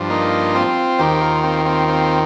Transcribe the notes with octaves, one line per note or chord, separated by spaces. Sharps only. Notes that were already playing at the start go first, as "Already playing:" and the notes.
Already playing: G2 F3
A#3 D#4
C4 F4
D#2 D#3 G4 C5
F4 A#4
C4 F4
C4 F4
C4 F4